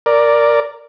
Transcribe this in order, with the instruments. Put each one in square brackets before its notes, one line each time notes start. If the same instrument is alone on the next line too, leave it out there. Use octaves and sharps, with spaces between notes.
[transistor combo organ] A#4 D5